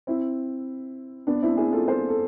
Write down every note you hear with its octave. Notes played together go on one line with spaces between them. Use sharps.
C4 E4
B3 D4
C4 E4
E4 G#4
F4 A4
A4 C5
A4